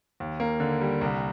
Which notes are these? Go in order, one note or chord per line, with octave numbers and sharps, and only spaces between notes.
D#2
A#3
D3
G3
C2